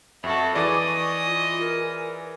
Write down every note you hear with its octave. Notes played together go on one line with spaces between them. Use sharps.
F2 F#4 A4 E5
E3 G#4 D5 D#5 D6 D#6
C#6
F4
A#4